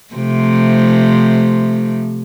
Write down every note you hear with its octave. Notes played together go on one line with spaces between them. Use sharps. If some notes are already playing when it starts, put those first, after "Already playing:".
C3 F3 A3